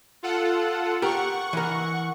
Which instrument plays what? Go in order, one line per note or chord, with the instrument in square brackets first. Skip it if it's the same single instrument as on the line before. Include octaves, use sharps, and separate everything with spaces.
[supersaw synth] F4 A4 F#5
[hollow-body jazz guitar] G4 A#4 [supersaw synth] F#5 C#6
[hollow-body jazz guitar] E3 A#4